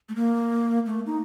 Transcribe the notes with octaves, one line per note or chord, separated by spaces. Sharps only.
A3
A#3
A3
D#4